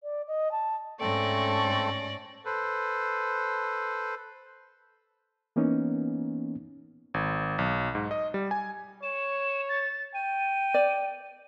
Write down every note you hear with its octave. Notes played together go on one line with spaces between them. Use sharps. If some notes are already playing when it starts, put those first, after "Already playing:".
D5
D#5
A5
G#2 A3 C4 C#4 A4 D5 C#6 A#6
A4 B4 C5
E3 A#3 B3 C#4 D#4
G#1
B1
G#2
D#5
G3
G#5
C#5 E7
A6
G5 D#7
D5